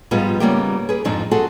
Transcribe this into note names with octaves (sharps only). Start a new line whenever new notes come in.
G#2 F3 G3 G#3 B3 F4
C#3 F3 G3 A#3 B3 G4
G#4 B4
F2 G#2 F3 C4 D4 D#4
C4 F#4 G#4 A4